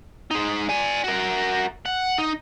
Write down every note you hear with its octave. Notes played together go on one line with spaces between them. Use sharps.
G#3 D#4
D5 G#5
F#4 A#4
F#5
D#4